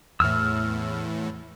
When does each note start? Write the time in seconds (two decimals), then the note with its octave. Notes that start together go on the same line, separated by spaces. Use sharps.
0.20 E2 A2 E6 F6